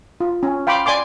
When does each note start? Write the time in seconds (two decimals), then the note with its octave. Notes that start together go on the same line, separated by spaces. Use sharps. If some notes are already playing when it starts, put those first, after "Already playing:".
0.20 F4
0.43 C#4
0.67 F5 G5 B5 C6 D6
0.86 D5 G#5 C6 D6